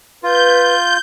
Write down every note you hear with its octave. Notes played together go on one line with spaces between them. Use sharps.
F4 B4 G6